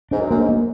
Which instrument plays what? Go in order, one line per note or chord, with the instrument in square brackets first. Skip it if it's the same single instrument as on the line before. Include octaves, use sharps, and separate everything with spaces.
[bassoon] G#2 [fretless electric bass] D4
[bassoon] F#2
[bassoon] F#2 [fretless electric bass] A#3
[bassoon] G#2
[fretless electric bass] A#3